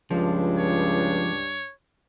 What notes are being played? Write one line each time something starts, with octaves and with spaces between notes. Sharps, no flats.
C#2 G2 F3 D4
C#5